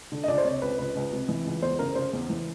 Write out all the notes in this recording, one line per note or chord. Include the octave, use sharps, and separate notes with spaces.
D3
D#5
C#2 D5
C5
C3 C#5
C#2 B4
C#2 B4
C#2
C3
E3
C#2
E2 C5
C#3 A#4
C#3 C5
E2
E3